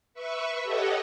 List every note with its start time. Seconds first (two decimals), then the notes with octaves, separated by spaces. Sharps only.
0.14 B4 E5 C#6
0.63 G4 A4 C#5 D#5 F#5